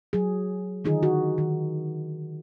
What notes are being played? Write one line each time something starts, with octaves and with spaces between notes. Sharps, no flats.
F#3 G#4
D3 D#3 D#4 F4 G#4
F#4
D#3